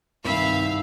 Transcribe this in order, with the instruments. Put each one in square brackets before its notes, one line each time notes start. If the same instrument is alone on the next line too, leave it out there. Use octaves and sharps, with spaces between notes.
[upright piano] C2 D#3 [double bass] G2 [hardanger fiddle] E5 B5 [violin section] F5